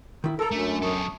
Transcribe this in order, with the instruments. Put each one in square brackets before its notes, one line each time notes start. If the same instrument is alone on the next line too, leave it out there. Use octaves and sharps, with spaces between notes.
[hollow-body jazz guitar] D#3 E4
[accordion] A4 [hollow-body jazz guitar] A#4 A#5
[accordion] F#2 [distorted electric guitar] A3 [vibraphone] D4
[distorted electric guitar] F#3 A4 [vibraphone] A5 C#6 D#6